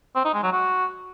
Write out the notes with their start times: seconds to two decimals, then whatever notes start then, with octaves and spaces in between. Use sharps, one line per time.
0.15 C4
0.25 D#4
0.34 G#3
0.43 F#3
0.52 F#4